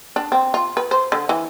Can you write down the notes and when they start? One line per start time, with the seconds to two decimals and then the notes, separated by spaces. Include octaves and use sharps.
0.16 D4
0.32 C4
0.54 F4
0.77 B4
0.91 C5
1.12 D3
1.29 E3